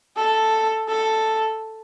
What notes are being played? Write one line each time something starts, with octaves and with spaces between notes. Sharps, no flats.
A4
A4